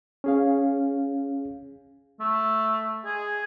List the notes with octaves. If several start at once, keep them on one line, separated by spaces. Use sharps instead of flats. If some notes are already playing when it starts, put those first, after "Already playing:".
C#4 G#4 F5
A3
G#4